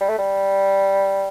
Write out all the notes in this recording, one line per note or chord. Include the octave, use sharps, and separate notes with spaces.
G3
A3
G3